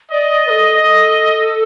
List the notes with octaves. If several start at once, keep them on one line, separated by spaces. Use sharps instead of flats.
D5 D#5
B4
A4
A4